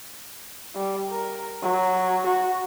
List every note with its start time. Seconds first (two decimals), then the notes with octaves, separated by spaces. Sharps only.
0.75 G3
1.10 A#4
1.63 F#3
2.26 F#4